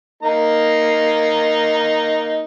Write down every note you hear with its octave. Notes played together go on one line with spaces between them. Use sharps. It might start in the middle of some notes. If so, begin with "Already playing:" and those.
A#3 D#4 A#5